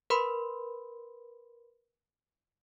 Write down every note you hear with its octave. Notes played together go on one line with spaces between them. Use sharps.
A#4 B4 B5 C6